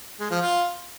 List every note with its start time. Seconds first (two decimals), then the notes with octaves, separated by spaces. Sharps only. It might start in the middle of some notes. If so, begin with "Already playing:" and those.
0.20 G#3
0.31 F3
0.41 F4